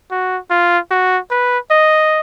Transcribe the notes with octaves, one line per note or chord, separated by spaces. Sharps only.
F#4
F4
F#4
B4
D#5